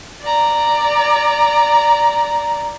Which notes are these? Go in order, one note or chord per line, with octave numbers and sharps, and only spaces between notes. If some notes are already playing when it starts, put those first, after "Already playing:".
D5 A#5